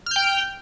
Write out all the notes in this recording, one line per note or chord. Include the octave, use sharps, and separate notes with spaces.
G5 F6 G6